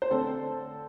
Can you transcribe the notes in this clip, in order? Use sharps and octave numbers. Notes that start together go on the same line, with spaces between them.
C5
D3 C4 A4